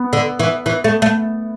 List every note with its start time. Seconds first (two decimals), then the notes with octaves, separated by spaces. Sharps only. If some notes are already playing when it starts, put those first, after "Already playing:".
Already playing: B3
0.13 D3
0.39 E3
0.66 E3
0.84 A3
1.02 A3